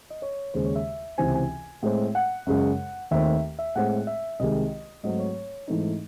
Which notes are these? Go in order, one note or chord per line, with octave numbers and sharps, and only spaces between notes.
D#5
C#5
D#2 C#3 G#3 C5
C#5
E5
C#2 C3 E3 C4 G#5
G#5
A2 G#3 C4
F#5
F#2 C#3 G#3
D#2 D#3 A3 C4 E5
E5
A2 G#3 C4 F#5
E5
C2 C3 D#3 G#3 D#5
G#2 F#3 A3 C4 D#5
C#5
G#2 E3 A3 C4 D#4